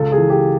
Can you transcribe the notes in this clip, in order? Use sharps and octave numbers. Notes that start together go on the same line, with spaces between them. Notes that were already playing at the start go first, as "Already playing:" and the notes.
Already playing: C#2 A4
G#4
E3
G4